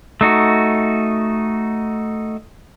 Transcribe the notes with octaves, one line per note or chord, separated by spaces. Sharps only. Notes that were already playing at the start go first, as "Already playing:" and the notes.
A3 D#4 F#4